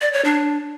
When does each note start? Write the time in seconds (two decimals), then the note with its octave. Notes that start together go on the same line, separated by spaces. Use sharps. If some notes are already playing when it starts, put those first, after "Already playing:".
0.01 D5
0.13 C#5
0.25 D4